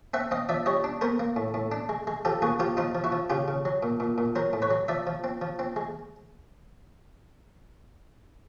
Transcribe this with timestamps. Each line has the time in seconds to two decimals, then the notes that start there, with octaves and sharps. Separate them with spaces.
0.14 C4 E5 F#5
0.31 C4 D#5 F5
0.49 F3 D5 E5
0.66 G3 C#5 D#5
0.84 D4
1.01 B3 A#4 C5
1.19 A#3
1.36 A2
1.54 A2
1.72 D4
1.89 G#3
2.07 G#3
2.25 F3 G4 A4
2.42 A#3 F#4 G#4
2.59 F3 F4 G4
2.77 F3 D#4 F4
2.95 F3
3.04 E4 F#4
3.12 F3
3.30 C#3 F4 G4
3.48 C#3
3.65 F#3
3.83 A#2
4.00 A#2
4.18 A#2
4.35 F#3 A#4 C5
4.53 A2
4.62 B4 C#5
4.70 F#3
4.88 F3 D5 E5
5.07 F3
5.24 C4
5.41 F3
5.59 C4
5.76 G#3